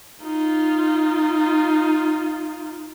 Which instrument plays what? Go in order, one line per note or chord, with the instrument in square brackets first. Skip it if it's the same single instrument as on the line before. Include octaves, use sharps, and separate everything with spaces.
[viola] D#4 F4